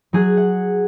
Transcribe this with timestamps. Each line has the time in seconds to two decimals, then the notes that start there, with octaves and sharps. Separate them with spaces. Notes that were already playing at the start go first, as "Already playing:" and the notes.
0.13 F#3 G#4 F#6
0.37 F#5